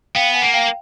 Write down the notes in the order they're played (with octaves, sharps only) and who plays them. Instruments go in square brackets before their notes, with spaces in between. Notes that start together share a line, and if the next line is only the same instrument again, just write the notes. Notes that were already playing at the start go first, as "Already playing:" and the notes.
[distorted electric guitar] B3 [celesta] F5 G5
[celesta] F#5 G#5
[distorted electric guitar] A#3
[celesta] F5 G5